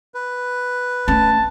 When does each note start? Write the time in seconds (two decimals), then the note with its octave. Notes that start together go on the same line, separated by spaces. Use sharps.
0.14 B4
1.08 A3 C#4 A5